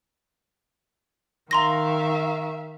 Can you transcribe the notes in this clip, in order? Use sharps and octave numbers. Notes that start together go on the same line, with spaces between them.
D#3 E5 F5 A#5 C6 A#6